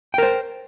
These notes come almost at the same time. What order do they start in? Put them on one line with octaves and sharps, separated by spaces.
G5 A#4 C5